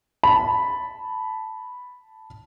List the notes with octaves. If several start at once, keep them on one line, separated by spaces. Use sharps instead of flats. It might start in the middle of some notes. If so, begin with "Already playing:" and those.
A5 B5